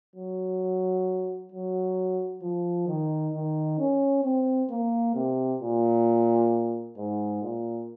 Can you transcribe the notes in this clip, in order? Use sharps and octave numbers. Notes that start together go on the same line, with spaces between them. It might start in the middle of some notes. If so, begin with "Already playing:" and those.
F#3
F#3
F3
D#3
D#3
C#4
C4
A#3
C3
A#2
G#2
A#2